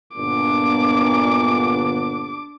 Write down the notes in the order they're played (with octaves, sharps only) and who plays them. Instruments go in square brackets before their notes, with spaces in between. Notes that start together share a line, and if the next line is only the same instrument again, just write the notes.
[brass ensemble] G1 A#2 B3 [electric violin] D4 D6